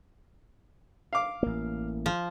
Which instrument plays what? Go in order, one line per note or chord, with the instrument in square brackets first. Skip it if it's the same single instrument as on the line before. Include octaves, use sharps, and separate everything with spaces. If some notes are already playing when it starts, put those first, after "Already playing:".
[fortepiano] F5 D6
[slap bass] A1 A#3
[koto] F3